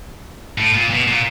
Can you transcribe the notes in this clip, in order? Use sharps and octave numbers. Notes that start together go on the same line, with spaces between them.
A2
A#2
B2
A#2